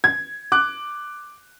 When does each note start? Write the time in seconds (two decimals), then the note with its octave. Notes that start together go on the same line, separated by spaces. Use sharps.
0.04 G#6
0.52 D6 F#6